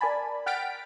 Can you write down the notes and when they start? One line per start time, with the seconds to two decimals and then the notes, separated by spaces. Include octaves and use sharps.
0.01 A#4 D5 G#5 A5 B5
0.46 F#5 G5 F6 A6 B6 D7